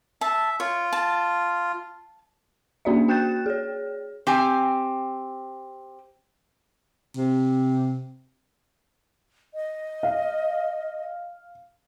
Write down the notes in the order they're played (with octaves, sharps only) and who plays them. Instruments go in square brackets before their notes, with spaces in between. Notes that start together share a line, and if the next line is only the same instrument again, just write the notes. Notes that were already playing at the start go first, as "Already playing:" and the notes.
[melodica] E5 [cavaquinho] A5
[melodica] F4 [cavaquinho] C#5
[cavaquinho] A5
[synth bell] A#3 C#4 D4 F#4 D5 E5
F#4 G5 F#6 G6 A6 E7
G#4 C#5
[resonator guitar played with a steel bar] C4 G4 G#5
[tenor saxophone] C3
[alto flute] D#5
[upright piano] F5